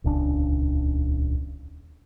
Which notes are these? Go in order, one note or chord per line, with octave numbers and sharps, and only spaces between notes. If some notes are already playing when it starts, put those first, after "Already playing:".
D#1 C#2 C#3 D4